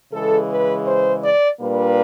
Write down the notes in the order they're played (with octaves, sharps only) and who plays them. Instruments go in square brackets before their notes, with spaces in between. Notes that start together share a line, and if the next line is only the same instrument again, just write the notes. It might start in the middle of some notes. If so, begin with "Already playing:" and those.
[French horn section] C#3 E3 G#3 A4
B4
C5
D5
A#2 G3 A#3 D4 B4